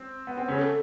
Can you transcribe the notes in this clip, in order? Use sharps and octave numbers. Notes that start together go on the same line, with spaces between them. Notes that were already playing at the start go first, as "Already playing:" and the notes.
Already playing: C4
B3
C4
C#3 C#4
A4